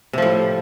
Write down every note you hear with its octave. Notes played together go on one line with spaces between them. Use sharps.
A2 C3 F3